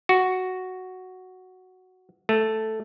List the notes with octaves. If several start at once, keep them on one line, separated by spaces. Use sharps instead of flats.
F#4
A3